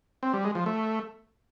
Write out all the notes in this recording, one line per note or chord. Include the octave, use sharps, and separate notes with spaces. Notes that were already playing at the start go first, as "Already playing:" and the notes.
C4
G3
G#3
F3
A3